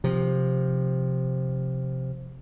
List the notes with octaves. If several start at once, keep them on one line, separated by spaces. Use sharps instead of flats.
C3 F3